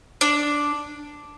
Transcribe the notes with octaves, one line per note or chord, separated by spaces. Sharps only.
D4